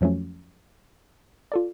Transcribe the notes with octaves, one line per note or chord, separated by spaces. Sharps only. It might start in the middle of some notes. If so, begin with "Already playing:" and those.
F2 F3 F#3 A3 C#4
F4 A4 D5